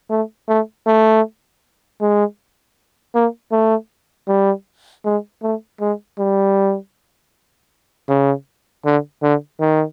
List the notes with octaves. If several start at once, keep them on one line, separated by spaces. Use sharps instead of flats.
A3
A3
A3
G#3
A#3
A3
G3
G#3
A3
G#3
G3
C#3
D3
D3
D#3